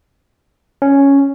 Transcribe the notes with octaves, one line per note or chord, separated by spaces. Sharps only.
C#4